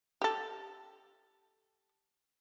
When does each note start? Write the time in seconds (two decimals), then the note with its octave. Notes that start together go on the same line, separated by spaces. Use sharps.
0.22 G4 A4